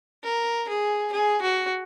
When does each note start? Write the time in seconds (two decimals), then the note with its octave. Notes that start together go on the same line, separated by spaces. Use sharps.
0.24 A#4
0.68 G#4
1.13 G#4
1.42 F#4